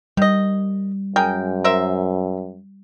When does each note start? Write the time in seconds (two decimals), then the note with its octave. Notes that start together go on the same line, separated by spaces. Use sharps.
0.17 D#3 G3 D#5
1.16 F#2 G#4 A#4 G5
1.64 A#4 C5 E5